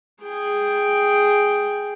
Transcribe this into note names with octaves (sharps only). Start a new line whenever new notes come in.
G#4 G5